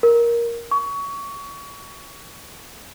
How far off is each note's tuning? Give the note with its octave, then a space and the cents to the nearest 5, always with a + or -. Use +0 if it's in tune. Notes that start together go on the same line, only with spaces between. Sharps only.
A#4 +10
C#6 +25